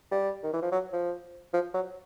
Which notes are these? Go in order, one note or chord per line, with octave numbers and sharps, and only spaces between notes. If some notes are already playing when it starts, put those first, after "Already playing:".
G3
D#3
E3
F3
F#3
F3
F3
F#3